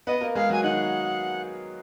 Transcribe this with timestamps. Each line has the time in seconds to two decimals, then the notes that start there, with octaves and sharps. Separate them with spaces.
0.07 B3 B4 D#5
0.21 A#3 A#4
0.35 G#3 G#4 F5
0.49 F#3 F#4
0.52 G#5
0.63 D#3 D#4 F#5